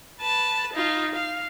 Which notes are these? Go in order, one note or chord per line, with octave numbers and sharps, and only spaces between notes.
B4 A5
D#4 F4
F5